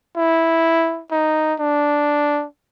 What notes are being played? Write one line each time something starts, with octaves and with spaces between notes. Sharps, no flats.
E4
D#4
D4